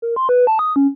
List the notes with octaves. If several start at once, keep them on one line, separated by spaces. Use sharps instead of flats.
A#4
C6
B4
A5
D#6
C#4